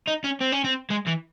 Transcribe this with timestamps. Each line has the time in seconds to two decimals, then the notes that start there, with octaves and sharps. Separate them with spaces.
0.07 D#4
0.24 C#4
0.41 C4
0.52 C#4
0.64 C4
0.91 G#3
1.07 E3